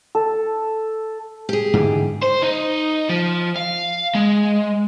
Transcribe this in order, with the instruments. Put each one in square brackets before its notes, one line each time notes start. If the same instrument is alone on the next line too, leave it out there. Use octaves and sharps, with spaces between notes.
[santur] A4
[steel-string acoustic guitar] G4 G#4
[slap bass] G#2 D3 E3
[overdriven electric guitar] C5
D#4
F3
F5
G#3